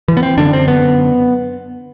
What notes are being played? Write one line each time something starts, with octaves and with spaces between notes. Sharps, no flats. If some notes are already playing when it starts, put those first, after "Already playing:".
E3
B3
C4
F#2 D3 D4
C4
B3